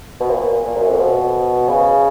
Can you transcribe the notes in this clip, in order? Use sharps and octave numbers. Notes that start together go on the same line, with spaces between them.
B2
A#2
A#2
F#2
F2
B2
C#3